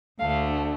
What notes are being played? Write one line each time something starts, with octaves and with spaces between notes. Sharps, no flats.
D2 D3 A3 F5